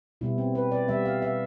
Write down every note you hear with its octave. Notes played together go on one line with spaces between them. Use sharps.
B2 G3 B3 E4
C4
B4
D5
E3 G3 B3 E5
F5
E5